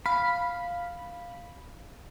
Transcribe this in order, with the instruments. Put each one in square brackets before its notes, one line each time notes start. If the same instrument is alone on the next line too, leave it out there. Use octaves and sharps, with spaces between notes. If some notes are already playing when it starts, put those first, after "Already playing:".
[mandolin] F5 [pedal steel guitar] B5